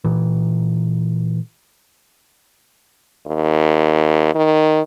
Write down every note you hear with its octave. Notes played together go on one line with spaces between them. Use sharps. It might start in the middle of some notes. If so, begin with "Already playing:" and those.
A#2 E3
D#2
D#3